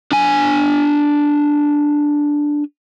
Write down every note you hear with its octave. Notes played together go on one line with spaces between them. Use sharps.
D4 G#5